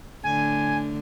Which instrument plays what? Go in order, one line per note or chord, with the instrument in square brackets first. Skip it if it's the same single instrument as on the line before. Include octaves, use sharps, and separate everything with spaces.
[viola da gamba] A2 D3 [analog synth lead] G#5